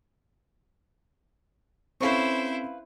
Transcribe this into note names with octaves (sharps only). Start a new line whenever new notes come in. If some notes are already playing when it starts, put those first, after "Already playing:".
C4 C#4 E4 A4 B4 C5 F5 C#6